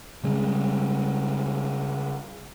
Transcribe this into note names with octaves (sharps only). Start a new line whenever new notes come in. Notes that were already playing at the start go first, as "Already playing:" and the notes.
C#3 G3 G#3 C#4